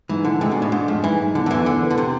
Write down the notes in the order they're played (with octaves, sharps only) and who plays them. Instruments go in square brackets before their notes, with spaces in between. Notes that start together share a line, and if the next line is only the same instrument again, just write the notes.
[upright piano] G#2 [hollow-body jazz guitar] E3
[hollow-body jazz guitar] D3 [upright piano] E3
[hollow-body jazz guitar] C3 [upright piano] G#3
[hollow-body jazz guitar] B2
[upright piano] D4
[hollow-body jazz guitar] A2
[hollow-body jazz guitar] G#2 [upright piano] D4
[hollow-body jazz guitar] F2 [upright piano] G#3
[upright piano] G#2 [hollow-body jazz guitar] E3
[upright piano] G#2
[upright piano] E2 [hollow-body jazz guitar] D3
[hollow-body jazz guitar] D3
[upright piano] E2 [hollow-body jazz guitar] E3
[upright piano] E2 [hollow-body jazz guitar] D3
[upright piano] B3
[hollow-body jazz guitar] D3
C3